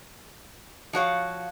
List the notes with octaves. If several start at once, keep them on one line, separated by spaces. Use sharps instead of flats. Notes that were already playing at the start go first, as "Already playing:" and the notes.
F3 F#4 C#5 F5